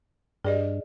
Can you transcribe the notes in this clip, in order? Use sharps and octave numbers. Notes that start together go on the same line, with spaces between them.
G2 G#4 D5 D#5